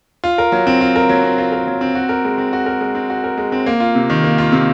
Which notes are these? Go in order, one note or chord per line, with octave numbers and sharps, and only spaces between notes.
F4
A#4
F#3
C4
F4
A#4
F#3
C4
F4
A#4
F#3
C4
F#4
A#4
G#3
C4
F#4
A#4
G#3
C4
F#4
A#4
G#3
C4
A#3
F4
C3
D#3
A#3
F4
C3